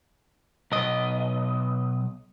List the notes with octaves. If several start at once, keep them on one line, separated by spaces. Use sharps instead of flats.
B1 D#5